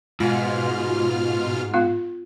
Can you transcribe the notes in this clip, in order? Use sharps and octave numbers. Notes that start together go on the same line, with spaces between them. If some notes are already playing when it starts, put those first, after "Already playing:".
G#2 B2 F4 F6
B3 F4 F5